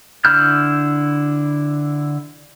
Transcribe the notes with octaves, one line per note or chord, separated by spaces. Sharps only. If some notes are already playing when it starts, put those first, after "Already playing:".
D3 E4 B5 F6 G6